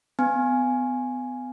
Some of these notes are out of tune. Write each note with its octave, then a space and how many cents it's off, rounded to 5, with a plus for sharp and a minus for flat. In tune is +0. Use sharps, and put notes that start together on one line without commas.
B3 +35 G#5 +0